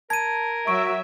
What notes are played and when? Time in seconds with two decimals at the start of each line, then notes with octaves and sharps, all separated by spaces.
0.10 A#4 A5 G#6 D#7
0.67 F#3 E5 C#6 D7